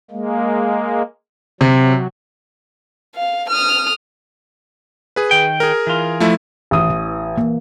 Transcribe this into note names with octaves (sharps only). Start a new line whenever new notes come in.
G#3 A#3
C3 F#3
F5
D#6 F6
G#4 B4
D#3 G5
G#4 A#4
E3 F4
F3 A3 E4
A1 D#6
E3
A#3